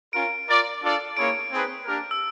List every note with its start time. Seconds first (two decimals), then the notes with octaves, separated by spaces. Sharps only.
0.13 C#4 F4 A#4 D7
0.48 F4 A#4 D5
0.82 D4 F4 A4 D5
1.17 A#3 C#4 E4 G#4 C#5 D7
1.51 C4 D#4 G#4 B4
1.85 A#3 D4 G4 A#4
2.11 E6